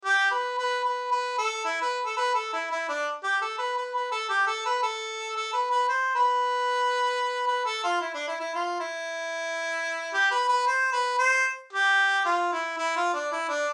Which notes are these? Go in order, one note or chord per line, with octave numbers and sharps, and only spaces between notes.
G4
B4
B4
B4
B4
A4
E4
B4
A4
B4
A4
E4
E4
D4
G4
A4
B4
B4
B4
A4
G4
A4
B4
A4
A4
B4
B4
C5
B4
B4
A4
F4
E4
D4
E4
E4
F4
E4
G4
B4
B4
C5
B4
C5
G4
F4
E4
E4
F4
D4
E4
D4